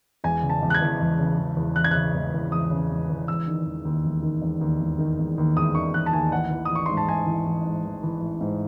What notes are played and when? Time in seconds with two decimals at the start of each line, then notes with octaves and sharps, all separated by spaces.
0.24 E1 G#5
0.43 C#3
0.49 A5
0.62 E1
0.70 F#6
0.74 G#6
0.82 E2
1.01 E1
1.19 C#3
1.39 E1
1.57 E2
1.76 E1 F#6
1.84 G#6
1.91 C#3 F#6
2.14 E1
2.34 E2
2.52 E1 D#6
2.71 C#3
2.90 E1
3.09 E2
3.28 E1 E6
3.48 D#3
3.66 E1
3.85 D#2
4.04 E1
4.23 D#3
4.42 E1
4.61 D#2
4.80 E1
4.99 D#3
5.19 E1
5.38 D#2
5.56 E1 D#6
5.75 D#3 C#6
5.93 E1 F#6
6.06 A5
6.13 D#2 G#5
6.32 A1 F#5
6.51 E3
6.65 D#6
6.71 A1 C#6
6.86 G#2 C6
6.97 A5
7.08 A1 G#5
7.26 E3
7.47 A1
7.65 G#2
7.85 A1
8.03 E3
8.21 A1
8.41 G#2